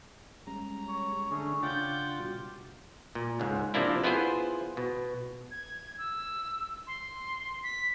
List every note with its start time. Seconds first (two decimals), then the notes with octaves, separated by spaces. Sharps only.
0.47 G3 G#3 C#4 A#5
0.88 C#5
1.31 D3 A3 C#4 D4 G#4 C#5
1.63 C#3 D4 F4 F#5 G5 D6 A6
2.20 B2 G3 F#4
3.15 A#2
3.40 C#2 G#2
3.74 C3 F3 A#3 D4 E4
4.04 B3 E4 F4 G#4 C5
4.77 B2
5.51 G#6
5.98 E6
6.87 C6
7.63 B6